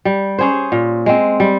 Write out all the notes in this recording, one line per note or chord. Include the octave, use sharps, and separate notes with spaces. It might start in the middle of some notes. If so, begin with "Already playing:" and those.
G3
C#4 G#4 C5
A#2
G#3 C4
G3